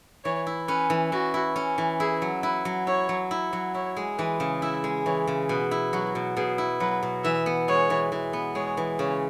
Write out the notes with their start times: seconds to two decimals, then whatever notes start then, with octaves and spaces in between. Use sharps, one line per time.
0.24 E3 C#5
0.47 E4
0.68 C#4 B4
0.90 E3
1.12 E3 F#4
1.34 E4
1.56 C#4
1.78 E3
2.00 E4 G#4
2.22 F#3
2.43 E4 B4
2.65 F#3
2.86 E4 C#5
3.09 F#3
3.31 E4
3.53 F#3
3.74 E4 C#5
3.97 G#3
4.18 E3 B4
4.40 C#3
4.62 E4 E5
4.84 G#3
5.06 E3 C#5
5.27 C#3
5.49 B2 B4
5.71 E4
5.93 F#3 F#4
6.15 B2
6.36 B2 G#4
6.58 E4
6.80 F#3 B4
7.03 B2
7.24 E3 E5
7.46 B3
7.68 G#3 C#5
7.90 E3
8.12 E3
8.33 B3
8.55 G#3 C#5
8.77 E3
8.99 C#3 C#5